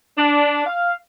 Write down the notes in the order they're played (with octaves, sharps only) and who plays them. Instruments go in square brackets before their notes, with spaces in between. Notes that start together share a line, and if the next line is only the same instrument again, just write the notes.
[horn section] D4
F5